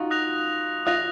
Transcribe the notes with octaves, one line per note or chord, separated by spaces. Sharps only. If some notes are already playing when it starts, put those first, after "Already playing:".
Already playing: D#4 F4 F#4
D#6 F#6 A#6 F7
F4 D#6 F#6 A#6 F7